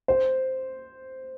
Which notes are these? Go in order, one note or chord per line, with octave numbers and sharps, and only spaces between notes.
C5